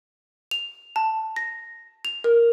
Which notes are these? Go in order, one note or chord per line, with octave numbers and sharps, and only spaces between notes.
F7
A5
A#6
F7
A#4